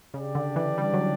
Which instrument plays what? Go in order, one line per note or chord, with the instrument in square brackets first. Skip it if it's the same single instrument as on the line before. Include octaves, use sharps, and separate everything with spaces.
[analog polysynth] C#3 [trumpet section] D4 G4 D5
[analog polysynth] D3
E3
G3
F#3